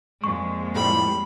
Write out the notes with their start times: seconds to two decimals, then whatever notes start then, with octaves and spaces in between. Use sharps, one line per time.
0.24 F2 A#2 G#3 C#6
0.75 A2 F3 G3 B5